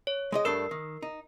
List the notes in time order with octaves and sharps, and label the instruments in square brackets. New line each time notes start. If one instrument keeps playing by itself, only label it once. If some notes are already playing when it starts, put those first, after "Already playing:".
[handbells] C#5
[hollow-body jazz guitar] G#3 D5 D#5
[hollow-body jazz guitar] G2 A3 D4 [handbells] A#4 E6 C7
[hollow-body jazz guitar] D#3
D#4